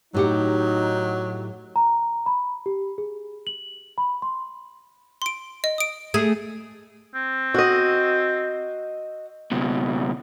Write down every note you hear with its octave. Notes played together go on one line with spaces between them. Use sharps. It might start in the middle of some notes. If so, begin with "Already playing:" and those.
A2 F#3 D#4 G4 F#5
A#5
B5
G4
G#4
F#7
B5
C6
C6 D7
D#5
D#6 D7
A3 G#4 G#6
C4
F#4 D#5
C#2 B2